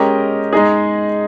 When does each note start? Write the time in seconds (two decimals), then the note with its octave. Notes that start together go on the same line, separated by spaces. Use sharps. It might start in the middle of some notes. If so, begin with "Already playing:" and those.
Already playing: G#3 C#4 G4 A#4 D#5
0.53 G#3 D#4 G#4